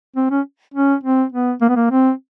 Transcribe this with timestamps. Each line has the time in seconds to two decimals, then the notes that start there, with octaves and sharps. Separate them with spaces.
0.16 C4
0.31 C#4
0.74 C#4
1.04 C4
1.33 B3
1.62 A#3
1.69 B3
1.76 A#3
1.91 C4